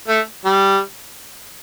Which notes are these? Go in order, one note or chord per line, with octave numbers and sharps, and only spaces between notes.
A3
G3